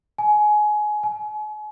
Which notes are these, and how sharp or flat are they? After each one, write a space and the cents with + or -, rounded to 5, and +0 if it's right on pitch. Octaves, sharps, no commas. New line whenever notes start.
G#5 +20
G#5 +40